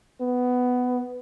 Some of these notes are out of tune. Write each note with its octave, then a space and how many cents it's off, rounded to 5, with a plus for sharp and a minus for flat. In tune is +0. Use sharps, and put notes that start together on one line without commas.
B3 +10